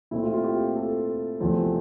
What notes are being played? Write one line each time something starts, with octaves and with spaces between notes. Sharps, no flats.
A#2 A3 C4 E4
F4
F4
G4
A4
E2 C3 F3 A3 C4